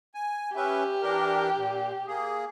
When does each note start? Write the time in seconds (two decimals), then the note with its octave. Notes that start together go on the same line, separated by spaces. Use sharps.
0.14 G#5
0.56 C#4 G4 B4 E5
1.02 E3 D4 A#4
1.57 A#2
2.07 A#3 G#4